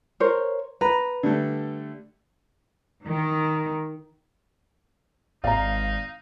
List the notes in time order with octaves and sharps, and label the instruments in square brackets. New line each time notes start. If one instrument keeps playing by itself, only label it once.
[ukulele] A#4 C5 C#5
[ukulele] B4 [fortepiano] A#5
[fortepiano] D3 G3 A3
[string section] D#3
[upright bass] G#1 [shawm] D#4 [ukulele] D5 D#5 A#5 [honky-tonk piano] F5